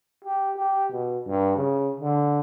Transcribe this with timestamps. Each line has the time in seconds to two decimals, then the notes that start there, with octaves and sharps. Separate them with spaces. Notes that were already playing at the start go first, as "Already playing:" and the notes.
0.25 G4
0.57 G4
0.92 B2
1.27 G2
1.57 C#3
2.00 D3